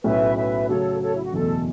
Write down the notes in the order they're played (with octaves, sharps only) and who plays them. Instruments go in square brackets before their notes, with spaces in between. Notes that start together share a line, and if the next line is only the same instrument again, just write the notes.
[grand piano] B1 A2 F#3 C#4 [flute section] B4 E5
[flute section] B4 E5
[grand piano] C#3 F#3 A3 F#4 [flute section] A4 C#5
[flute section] A4 C#5
E4
F#4
[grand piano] F#1 E2 B2 A3 [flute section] A4